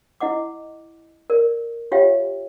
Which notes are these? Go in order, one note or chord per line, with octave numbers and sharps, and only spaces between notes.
E4 D#5 F#5 D6
A#4 D5
F4 G4 C#5 E5 F5 G5